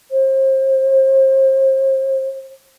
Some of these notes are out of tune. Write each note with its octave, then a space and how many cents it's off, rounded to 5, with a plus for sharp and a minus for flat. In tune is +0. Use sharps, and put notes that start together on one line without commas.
C5 +35